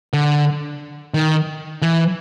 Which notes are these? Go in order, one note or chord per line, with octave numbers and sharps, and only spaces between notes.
D3
D#3
E3